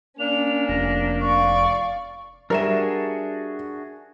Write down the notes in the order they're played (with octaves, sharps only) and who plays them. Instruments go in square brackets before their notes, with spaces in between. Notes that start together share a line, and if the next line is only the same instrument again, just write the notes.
[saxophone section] A#3 D4 [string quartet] C#4 [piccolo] F7
[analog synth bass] F1 [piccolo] A#6
[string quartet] D5 F5 [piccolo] C#6
[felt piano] G3 E5 E7 [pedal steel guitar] D4 F#4 G#4 [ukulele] A#4